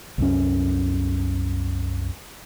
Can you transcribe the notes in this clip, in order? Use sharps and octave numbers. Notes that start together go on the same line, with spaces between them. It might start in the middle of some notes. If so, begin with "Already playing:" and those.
C2 F#2 C#4